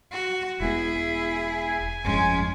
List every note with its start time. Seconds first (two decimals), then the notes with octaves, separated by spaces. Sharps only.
0.12 F#4
0.60 E1 G#3 B3 E4 G#4
1.54 G#5
2.04 G1 F2 G#3 C#4